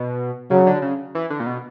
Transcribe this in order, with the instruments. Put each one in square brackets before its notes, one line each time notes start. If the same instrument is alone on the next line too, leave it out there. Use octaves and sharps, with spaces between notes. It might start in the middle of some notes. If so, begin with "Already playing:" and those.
Already playing: [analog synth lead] B2
[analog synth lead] C#3 [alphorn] F#3
[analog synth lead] D3
C#3
E3
D3
A#2
B2